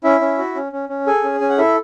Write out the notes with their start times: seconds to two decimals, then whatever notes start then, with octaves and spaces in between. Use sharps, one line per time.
0.04 C#4 E4 E5
0.21 C#4
0.38 F#4
0.55 C#4
0.72 C#4
0.89 C#4
1.06 G#4 A4 G#5
1.24 C#4
1.40 C#4 G#5
1.50 F#5
1.58 E4 A4 E5